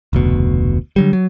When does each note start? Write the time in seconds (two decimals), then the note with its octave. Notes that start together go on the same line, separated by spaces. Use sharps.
0.13 F1 D2 B2
0.96 D3 F#3 G3
1.13 F#3